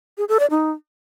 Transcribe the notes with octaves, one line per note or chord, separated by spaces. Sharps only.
G#4
A4
D5
D#4